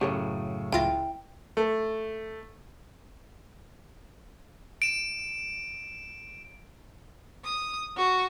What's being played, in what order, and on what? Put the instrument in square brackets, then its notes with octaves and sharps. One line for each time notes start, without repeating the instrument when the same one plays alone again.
[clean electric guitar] F#2 A2 C#3 [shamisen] G4 A4 C#5
[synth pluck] C#2 F4 A#6 [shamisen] E4 [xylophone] G5
[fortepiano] A3
[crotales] D7 E7
[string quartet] D#6
F#4